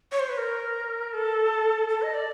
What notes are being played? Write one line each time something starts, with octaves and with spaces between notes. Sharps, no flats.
C#5
C5
B4
A#4
A4
A4
D#5
D5